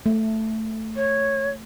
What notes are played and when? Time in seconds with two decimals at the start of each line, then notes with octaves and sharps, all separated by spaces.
0.06 A3
0.96 C#5